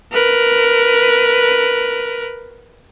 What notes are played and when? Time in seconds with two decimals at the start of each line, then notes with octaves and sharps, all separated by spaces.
0.12 A#4 B4